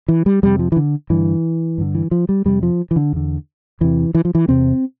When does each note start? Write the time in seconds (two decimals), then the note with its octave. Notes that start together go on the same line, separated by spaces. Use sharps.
0.08 E3
0.26 G3
0.43 F2 C3 G3
0.59 F3
0.72 E3
0.76 D3
1.10 G2 D3 E3
1.78 G2 D3
1.95 E3
2.11 F3
2.29 G3
2.45 F2 C3 G3
2.63 F3
2.91 E3
2.96 D3
3.13 E2 D3
3.81 E2 C3 E3
4.15 E3
4.25 F3
4.35 E3
4.48 E2 C3 C4